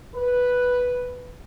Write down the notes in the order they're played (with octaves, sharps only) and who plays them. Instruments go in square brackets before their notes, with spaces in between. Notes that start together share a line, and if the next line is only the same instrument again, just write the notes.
[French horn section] B4